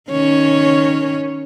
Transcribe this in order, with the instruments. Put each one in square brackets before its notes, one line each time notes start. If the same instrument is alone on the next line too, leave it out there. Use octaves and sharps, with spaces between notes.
[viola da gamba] D#3 C#4 C#5